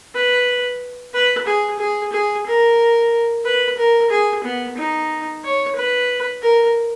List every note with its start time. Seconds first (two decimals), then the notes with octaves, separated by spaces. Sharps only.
0.14 B4
1.14 B4
1.46 G#4
1.79 G#4
2.12 G#4
2.46 A#4
3.45 B4
3.78 A#4
4.10 G#4
4.44 B3
4.77 D#4
5.44 C#5
5.76 B4
6.42 A#4